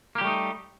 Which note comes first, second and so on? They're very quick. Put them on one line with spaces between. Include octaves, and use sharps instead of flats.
A#3 G4 G3 A3 D#4